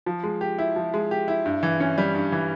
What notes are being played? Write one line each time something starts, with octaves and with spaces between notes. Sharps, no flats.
F3
G#3
G4
E4
F3
G#3
G4
E4
G2
E3
C#4
G3
G2
E3